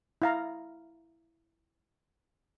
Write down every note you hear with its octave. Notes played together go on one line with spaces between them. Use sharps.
E4 F5 A#5